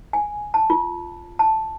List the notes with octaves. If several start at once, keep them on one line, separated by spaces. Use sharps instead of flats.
G#5
A5
F4
A5